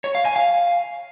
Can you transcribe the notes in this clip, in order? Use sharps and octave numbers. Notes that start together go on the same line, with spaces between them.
C#5
F5
G#5
F5